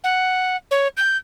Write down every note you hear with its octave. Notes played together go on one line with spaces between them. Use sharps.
F#5
C#5
G6